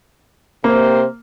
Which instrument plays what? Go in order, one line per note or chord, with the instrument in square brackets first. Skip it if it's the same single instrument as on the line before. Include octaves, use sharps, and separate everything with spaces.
[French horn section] C3 C5 [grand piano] A#3